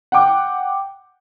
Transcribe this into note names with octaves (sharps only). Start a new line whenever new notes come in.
F#5 G5 D6